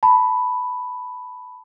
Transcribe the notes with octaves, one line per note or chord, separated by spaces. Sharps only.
A5 B5